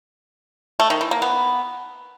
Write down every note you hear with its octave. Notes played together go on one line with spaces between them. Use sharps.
A3
D#3
E3
A#3
B3